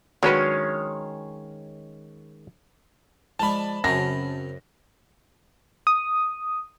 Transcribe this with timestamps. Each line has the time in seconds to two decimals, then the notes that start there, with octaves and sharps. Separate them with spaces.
0.23 D#3 F#3 G#3 C#4 D4 B4 C#5 F5
3.39 F3 G#3 D5 A5 B5
3.84 F#2 C#3 C4 A#6
5.87 D#6